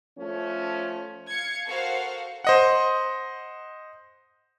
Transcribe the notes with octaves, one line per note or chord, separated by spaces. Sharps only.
F3 A3 C#4
F5 G#6 C#7
F#4 A4 A#4 C5 F5 F#5
C5 D#5 F#5